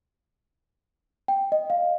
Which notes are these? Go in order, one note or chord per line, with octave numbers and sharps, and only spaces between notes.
G5
D#5
F5